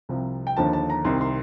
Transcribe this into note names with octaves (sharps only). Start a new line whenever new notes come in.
C2 C3 F3
G5
D#2 D3 F3 A5
A5
A#5
C2 C3 D#3 C6
C6